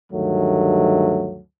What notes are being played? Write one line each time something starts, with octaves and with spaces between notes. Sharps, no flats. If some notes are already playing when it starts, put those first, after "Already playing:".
D2 G2 D#3 F#3 A3